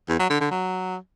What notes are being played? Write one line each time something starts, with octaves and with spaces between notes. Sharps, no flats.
E2
F#3
D3
D3
F#3